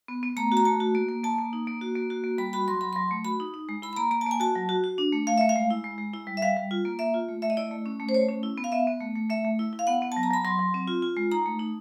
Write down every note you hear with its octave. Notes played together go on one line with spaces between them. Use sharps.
B3
B3
A3 A#5
F#4
A#5
A3 A5
F#4
A#3
A#3
A#3 A5
A#3
D#4
A#3
F#4
A#3
F#4
A#3
G3 B5
F#4 B5
F#3 C6
F#3 B5
F#3 C6
A3
F#4 B5
D#4
D#4
G#3
E4 B5
B5
A#3 A#5
A#3 A#5
A5
A#3 G#5
F#4 A5
F#3
F#4
F#4
D4
A3
A3 F5
A3 E5
F5
G#3
E4
G#3
G#3
E4
G3
E5
G3 F5
G3
F4
A#3
A#3 E5
F4
A3
A3 E5
D#5
E4 D5
A3
C#4
A3
C5
A3 C#5
C#4
E4
B3
F5
B3 E5
B3
A3
A3
A3 E5
A3
E4
E4
F5
B3 F#5
B3
F#3 A5
A#5
F#3 B5
F#3 C6
F#3
C4
F4
F4
G#3
D#4 A#5
A3
D#4